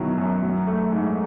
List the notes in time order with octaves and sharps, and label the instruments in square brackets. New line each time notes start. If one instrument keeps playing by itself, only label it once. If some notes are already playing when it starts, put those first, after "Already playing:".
Already playing: [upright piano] B2 D#3 F#3 E4
F#2
F#3
A3
G#2